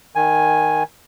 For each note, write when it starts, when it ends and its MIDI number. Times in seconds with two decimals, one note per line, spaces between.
0.15 0.83 51
0.15 0.83 80